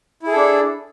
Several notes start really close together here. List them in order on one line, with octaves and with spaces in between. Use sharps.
E4 G#4 A4 D4